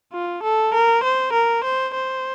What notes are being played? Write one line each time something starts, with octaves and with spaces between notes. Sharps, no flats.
F4
A4
A#4
C5
A#4
C5
C5